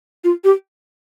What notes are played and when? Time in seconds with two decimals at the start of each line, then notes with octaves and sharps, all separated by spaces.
0.24 F4
0.44 G4